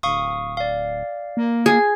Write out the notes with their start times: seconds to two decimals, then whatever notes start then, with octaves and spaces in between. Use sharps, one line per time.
0.03 D1 F5 C#6 D#6
0.57 D5 F5
1.37 A#3
1.66 G#4